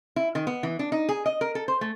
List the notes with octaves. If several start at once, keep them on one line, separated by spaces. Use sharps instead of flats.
E4
D#3
B3
E3
D4
D#4
G#4
D#5
A#4
A4
C5
A3